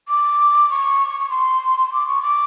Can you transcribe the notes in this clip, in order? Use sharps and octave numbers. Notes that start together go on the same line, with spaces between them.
D6
C#6
C#6
C6
D6
C#6
D6